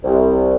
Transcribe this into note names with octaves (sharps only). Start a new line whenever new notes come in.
C2